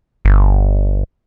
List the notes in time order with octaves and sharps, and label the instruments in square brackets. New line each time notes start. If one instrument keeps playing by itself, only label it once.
[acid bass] G1